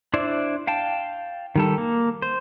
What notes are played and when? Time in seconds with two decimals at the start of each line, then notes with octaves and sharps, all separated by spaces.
0.14 D4 E4 C5 D5
0.67 F5 G5 A5
1.56 D#3 G3 A4
1.78 A#3
2.22 C5